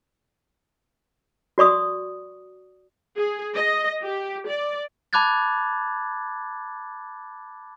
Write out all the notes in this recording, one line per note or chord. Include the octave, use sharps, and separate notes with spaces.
F#4 D5 C#6 D#6
G#4
D#5
G4
D5
A5 B5 D6 F#6 G#6 A6